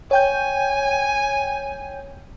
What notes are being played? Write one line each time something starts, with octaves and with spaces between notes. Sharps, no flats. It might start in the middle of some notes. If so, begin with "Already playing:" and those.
C#5 G5 G#5 G6